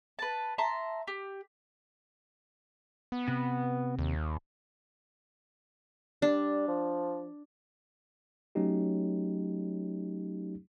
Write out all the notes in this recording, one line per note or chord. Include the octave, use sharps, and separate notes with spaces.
B4 A5
E5 A5 A#5 C6
G4
B3
C3
D#2
G3 D4
F3
F#3 A3 C#4 D#4 G4